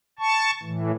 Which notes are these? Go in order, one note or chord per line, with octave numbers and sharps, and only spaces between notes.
A5 C#6
A2 E3